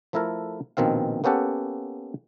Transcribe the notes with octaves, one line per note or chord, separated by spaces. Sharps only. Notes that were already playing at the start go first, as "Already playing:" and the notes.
F3 A3 E4 A4 A#4
A#1 B2 D#3 C4 F5
A#3 B3 C#4 G4 A4 F#5